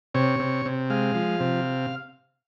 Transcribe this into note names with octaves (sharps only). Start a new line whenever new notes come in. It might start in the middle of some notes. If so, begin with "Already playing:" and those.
C3 C#5
C3
C3
G#3 F5
F3
C3